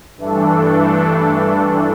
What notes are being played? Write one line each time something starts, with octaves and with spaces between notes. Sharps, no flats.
G2 E3 A3 D4 A4